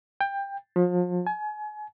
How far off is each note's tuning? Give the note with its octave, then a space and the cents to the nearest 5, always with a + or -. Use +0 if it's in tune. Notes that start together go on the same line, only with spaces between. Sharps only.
G5 +20
F3 +35
G#5 +35